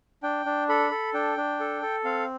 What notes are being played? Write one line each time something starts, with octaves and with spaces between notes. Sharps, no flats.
D4 G5
D4
A4 B5
A4
D4 G5
D4
A4
A4
C4 F5